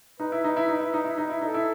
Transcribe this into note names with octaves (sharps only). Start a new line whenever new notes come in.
D#4 B4
E4
D#4
E4
D#4
E4
D#4
E4
D#4
E4
D#4 A4
E4